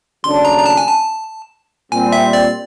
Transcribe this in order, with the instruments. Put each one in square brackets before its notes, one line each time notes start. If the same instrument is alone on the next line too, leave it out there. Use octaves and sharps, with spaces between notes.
[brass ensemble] D#2 C#3 F#3 A3 D4 [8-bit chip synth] C6
[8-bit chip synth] A#5
A#5
A5
G#5
A5
[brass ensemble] A#2 G3 C4 [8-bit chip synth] G#5
[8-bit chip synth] E5
D5